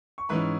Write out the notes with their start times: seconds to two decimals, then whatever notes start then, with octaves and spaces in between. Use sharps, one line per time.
0.18 C#6
0.29 G#2 E3 C#4 B4 B5